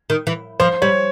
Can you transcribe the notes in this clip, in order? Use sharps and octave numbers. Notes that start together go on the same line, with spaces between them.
D#3
E3
F3 C5
G3 C#5